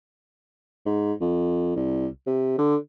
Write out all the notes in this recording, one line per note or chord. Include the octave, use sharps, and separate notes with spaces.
G#2
F2
C2
C3
D3